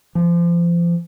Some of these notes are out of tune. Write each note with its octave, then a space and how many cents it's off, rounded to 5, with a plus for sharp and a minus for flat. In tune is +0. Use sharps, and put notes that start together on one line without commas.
F3 -30